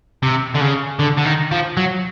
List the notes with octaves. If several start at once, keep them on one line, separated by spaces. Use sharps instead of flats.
C3
D3
C#3
D3
D3
D#3
F3
F#3